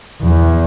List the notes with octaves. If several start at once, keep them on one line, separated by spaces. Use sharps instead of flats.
E2